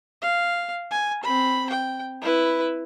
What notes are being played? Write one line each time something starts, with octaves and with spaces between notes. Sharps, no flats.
F5
G#5
C4 B5
G5
E4 B4